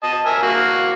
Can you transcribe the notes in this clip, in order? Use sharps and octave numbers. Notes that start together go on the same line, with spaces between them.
D#5 A5
A#4 E5 G#5
A#3 F#4